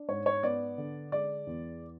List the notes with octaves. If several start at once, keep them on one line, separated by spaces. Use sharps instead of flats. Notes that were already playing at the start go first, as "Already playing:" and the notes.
Already playing: D4
G#2 C#5
C#5
B3 D5
D3
G#3 D5
E2